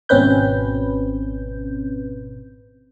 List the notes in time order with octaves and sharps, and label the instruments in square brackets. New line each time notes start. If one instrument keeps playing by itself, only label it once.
[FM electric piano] G#1 B2 C4 C#4 B4 G6